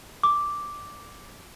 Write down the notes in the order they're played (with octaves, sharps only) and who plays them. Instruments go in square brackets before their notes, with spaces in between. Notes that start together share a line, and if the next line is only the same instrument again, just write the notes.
[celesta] D6